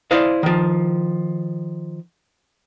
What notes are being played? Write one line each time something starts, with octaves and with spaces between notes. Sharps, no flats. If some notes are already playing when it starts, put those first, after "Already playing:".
E4 C5 D5 D#5 F5
D#3 F3